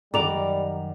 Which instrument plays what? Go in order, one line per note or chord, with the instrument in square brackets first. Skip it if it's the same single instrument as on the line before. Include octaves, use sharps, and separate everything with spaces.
[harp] F#2 D#3 F#4 [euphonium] G3 [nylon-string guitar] D5 [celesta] A#5 F7